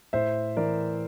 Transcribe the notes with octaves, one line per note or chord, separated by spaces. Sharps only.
A2 C5 E5
E3 A#4 D5